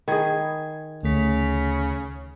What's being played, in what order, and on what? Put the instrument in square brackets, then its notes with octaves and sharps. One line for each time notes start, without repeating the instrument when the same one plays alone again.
[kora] D#3 G#4 [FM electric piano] B5 G#6
[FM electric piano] D2 A3 B6 [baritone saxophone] C#3